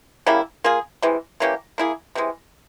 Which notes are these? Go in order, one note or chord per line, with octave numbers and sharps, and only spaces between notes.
C#3 G3 A#3 E4
A#3 F4 G#4
C3 E3 G#3
E3 A#3 C#4 G4
A#3 E4 G#4
C3 E3 G#3